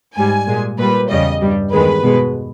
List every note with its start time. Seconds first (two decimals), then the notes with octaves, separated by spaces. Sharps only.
0.16 G#2 G3 G#5
0.48 A#2 G#3
0.78 A#2 G3 B4
1.09 E2 C#3 G3 D#5
1.41 G2 G3
1.72 E2 D#3 G#3 B4
2.03 B2 G#3